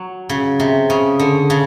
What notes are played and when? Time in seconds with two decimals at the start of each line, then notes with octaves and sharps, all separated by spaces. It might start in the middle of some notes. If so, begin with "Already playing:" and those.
Already playing: F#3
0.29 C#3
0.60 C3
0.90 C#3
1.19 D3
1.50 C#3